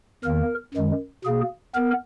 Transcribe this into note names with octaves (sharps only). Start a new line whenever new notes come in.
E2 D#3 A#3 A#4
F#2 D#3 G#3
B2 A#3 G#4
B3 A#4